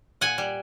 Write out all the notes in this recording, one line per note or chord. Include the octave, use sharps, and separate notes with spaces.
A#2 F#5 G#5
G3